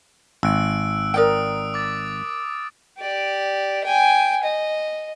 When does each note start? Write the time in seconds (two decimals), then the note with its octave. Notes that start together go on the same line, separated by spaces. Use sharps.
0.43 G#1 E6 F#6 D7
1.14 A#4 D5 G5 D#6 E6 D7
1.74 D6 A6
2.99 G4 D5
3.84 G5 G#5
4.44 D#5